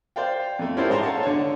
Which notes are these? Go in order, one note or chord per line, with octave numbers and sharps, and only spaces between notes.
C5 D5 F5 G5
F2 A3
C#4 E4 G4 A#4 C5 D5
G#2 G#4 A5 A#5 C6
A4 C#5 F5 F#5 A5
D3 D4 C#5